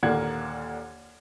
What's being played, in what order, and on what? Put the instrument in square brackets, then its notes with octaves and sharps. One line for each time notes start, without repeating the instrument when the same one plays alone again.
[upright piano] D#2 A#2 D3 A#3 F#5 G#6